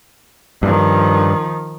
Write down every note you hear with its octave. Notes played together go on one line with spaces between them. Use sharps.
G2 D#3 F3